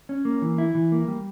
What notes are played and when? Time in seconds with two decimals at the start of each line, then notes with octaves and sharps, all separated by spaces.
0.09 C#4
0.25 A#3
0.42 E3
0.58 E4
0.75 E3
0.92 A#3
1.08 G3